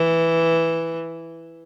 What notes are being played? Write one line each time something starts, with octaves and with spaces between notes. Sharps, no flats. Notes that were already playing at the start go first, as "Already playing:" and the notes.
Already playing: E3